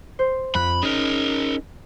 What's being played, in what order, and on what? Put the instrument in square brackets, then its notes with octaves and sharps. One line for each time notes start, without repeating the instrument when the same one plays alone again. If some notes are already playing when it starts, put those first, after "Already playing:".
[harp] C5
[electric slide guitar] F2 F3 [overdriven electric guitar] B5 [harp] F#6
[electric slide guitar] C#4 D#4 [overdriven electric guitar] G#4 A#4